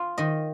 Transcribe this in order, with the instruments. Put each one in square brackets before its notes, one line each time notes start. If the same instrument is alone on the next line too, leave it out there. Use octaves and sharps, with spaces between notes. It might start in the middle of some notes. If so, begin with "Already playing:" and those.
Already playing: [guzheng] F4
D#3 D#5